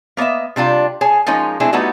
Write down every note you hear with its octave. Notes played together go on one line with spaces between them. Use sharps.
A#3 B3 C#5 D#5 E5
C3 G3 D4 F4
G#4 C#5 G#5 A5
F3 G#3 A#3 C#4 D#4
G#3 A3 C4 D4 E4 G#4
G3 A3 B3 D#4 E4 F#4